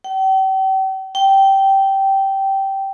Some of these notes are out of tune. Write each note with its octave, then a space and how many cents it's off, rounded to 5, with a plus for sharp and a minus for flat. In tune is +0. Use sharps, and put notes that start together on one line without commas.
G5 -40
G5 -15